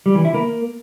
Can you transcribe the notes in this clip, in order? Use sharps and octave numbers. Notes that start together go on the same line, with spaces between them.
G3
E3
E4
A#3